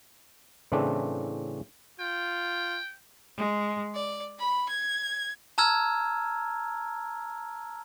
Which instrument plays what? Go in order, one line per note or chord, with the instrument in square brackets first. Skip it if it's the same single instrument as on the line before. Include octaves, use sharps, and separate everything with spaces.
[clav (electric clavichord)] A2 C#3 E3 A3 C4 D4
[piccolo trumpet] F4 [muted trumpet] G5
[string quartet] G#3
D5
B5
G#6
[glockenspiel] A5 A#5 E6 F6 G#6